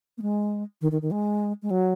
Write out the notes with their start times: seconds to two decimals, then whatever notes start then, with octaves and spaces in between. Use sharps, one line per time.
0.18 A#3
0.22 G#3
0.81 D#3
0.92 D#3
1.02 D#3
1.11 G#3
1.62 G#3
1.71 F#3